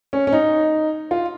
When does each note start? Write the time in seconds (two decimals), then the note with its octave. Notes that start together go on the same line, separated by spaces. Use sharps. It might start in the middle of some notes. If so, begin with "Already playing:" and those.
0.13 C#4
0.27 C#4
0.33 D#4
1.11 F4